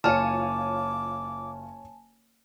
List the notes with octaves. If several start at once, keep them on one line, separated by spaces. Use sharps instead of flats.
F#1 F4 C#5 G#5 A5 D6 F6 C#7